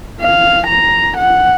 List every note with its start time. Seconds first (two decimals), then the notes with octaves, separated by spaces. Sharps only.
0.21 F5
0.67 A#5
1.18 F#5